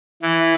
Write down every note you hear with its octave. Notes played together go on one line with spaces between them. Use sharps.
E3